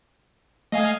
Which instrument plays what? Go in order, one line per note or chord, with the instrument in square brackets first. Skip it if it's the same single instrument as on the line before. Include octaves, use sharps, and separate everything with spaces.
[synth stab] A3 [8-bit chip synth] D#5 F5 G#5